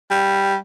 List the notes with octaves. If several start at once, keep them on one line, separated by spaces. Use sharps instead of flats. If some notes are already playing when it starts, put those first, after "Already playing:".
G3